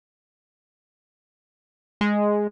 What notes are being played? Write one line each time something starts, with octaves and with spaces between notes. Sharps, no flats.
G#3